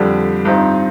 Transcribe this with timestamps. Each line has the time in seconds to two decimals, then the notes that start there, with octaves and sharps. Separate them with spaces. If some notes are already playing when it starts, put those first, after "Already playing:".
Already playing: F2 D3 G3
0.45 G2 F3 C4 D#4